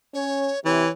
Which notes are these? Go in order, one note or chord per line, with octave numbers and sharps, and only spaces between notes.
C#4 C#5
C3 E3 C#5